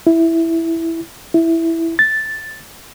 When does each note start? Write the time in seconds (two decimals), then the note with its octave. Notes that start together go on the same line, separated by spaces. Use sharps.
0.07 E4
1.34 E4
1.99 A6